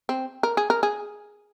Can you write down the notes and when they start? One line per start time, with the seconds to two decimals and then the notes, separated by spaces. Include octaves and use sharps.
0.09 C4
0.43 A#4
0.57 G#4
0.70 A#4
0.83 G#4